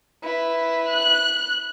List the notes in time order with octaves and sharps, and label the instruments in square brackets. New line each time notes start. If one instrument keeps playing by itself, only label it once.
[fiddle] E4 B4
[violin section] F#6